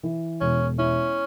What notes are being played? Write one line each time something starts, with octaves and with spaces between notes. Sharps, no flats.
E3
E1 C#4
C#4 E4